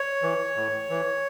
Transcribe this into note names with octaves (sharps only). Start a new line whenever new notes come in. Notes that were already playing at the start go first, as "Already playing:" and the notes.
Already playing: C#5
E3
A2
E3